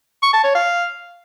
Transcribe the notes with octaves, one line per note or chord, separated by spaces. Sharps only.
C#6
A5
C#5
F5